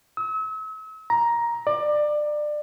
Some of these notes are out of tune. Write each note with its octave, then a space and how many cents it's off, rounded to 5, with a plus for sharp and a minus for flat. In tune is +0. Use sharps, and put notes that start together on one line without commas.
E6 -40
A#5 +10
D5 +25